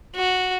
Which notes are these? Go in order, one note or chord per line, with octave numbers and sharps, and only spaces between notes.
F#4